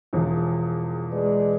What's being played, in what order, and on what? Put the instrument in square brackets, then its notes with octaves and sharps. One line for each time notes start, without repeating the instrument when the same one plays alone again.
[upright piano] E1 E2 F3
[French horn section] G#3 B4 D5